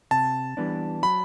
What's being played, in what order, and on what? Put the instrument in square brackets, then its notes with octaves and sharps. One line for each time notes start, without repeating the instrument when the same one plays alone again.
[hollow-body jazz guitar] C3 [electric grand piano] A5
[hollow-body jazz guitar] E3 G3 B3 D4
[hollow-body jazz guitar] F#3 [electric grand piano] B5